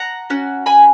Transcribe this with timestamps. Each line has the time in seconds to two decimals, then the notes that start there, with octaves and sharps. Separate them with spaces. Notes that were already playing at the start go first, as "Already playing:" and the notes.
Already playing: F#5 A#5
0.30 C#4 F#4
0.66 G#5 B5